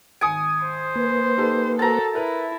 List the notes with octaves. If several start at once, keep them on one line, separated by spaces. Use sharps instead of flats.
G#1 G#5 D#6 C#7 D7
C5
A#3 B4
D#4 G4 A4
F#4 A4 A#4 C5 A5 A#5
E4 A#4 B4